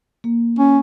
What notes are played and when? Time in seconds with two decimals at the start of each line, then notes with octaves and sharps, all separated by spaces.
0.24 A#3
0.59 C#4